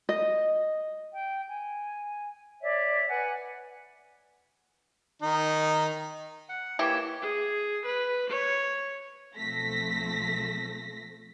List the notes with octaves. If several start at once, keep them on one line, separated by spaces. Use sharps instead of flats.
D#5
G5
G#5
C#5 D5 E5
B4 F#5 G#5
D#3 D#4
F#5
E3 A#3 G4 C#5 E6
G#4
B4
C#5
B1 F3 A3 C4 A#6 B6